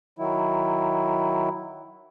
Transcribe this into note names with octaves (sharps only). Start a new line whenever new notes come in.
D#3 F#3 E4